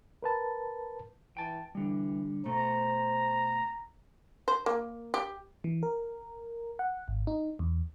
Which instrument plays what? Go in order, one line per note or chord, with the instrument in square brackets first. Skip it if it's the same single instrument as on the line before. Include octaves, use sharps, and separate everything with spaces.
[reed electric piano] A#4 B4 A5
[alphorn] E3 [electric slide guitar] G5 A5
[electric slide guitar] D3 G3 [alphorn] E3
[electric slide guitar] B2 A3 [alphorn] C5 [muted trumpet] A#5
[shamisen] C5
A#3
G4
[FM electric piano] E3
A#4
F#5
G#1
D#4
E2